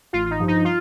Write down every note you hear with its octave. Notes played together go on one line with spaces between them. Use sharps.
A1 F4
F4
D#4
G2 F3
D#4
F4